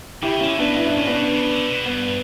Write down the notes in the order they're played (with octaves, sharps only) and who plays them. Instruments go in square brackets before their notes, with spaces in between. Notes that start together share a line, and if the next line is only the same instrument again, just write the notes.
[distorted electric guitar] C#3 [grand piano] E4 G4
[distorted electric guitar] D3 [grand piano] C#4 E4
[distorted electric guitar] A2 [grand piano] B3 D4
[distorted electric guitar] G2 [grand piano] E4
[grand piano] D4
[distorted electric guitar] A2 [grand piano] C#4
[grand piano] B3 D4
[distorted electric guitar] B2
C#3
D3
B2
[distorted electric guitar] G2 [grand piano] B3